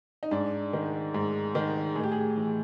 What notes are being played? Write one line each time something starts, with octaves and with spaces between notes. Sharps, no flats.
D#4
G#2 D4
D#3
G#2
D#3
A2 G#4
G4
G#4
E3